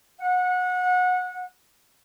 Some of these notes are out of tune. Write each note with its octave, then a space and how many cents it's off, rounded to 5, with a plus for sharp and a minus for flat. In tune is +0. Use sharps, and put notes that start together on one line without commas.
F#5 -25